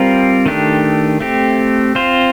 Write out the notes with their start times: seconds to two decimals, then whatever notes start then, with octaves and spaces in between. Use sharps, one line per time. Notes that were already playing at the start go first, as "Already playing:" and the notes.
Already playing: G3 C4 F4 A#4
0.46 D#3 A3 D4 G4
1.20 A3 C4 G4
1.95 C4 F4 C5